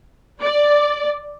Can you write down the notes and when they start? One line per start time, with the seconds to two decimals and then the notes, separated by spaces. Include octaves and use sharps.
0.41 D5